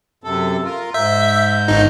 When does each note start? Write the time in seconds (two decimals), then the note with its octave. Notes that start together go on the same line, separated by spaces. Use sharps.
0.24 F#2 C3 A4
0.64 F4 A#4
0.94 G#2 E5 G6
1.68 G1 D#4